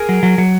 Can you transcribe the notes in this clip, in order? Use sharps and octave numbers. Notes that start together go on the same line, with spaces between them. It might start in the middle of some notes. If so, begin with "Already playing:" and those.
Already playing: G#4 A#4
F#3
F#3
F#3